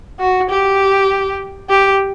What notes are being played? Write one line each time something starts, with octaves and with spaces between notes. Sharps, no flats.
F#4
G4
G4